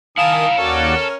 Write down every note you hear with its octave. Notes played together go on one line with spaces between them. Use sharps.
D#3 E4 A#4 F5 G#5 A5 D#6 E7
D#2 C#4 F#4 A4 A#4 C#5 D5